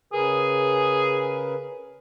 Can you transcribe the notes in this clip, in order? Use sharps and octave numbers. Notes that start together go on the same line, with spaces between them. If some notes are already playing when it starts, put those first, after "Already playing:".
C#3 G#4 A#4 B4